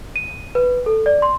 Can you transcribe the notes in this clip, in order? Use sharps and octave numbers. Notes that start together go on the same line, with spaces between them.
D#7
B4
A4
D5
C6